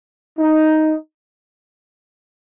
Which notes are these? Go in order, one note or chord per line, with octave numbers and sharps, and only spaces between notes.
D#4